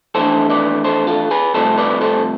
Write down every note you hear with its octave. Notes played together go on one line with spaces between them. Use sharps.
F2 E3 A3 D4 A4 C5
B4 D5
A4 C5
F4 A4
G#4 B4
C2 C3 F3 A3 A4 C5
B4 D5
A4 C5